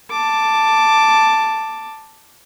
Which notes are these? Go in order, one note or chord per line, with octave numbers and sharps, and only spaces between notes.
A5 D6